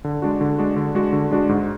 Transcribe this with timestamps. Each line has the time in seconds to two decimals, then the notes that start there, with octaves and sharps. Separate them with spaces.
0.04 D3
0.22 G#3 D4 F#4
0.41 D3
0.59 G#3 D4 F#4
0.76 D3
0.95 G#3 D4 F#4
1.13 D3
1.31 G#3 D4 F#4
1.49 G#2